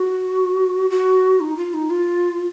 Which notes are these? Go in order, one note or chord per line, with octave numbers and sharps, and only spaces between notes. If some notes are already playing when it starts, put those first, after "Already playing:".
Already playing: F#4
F#4
D#4
F4
D#4
F4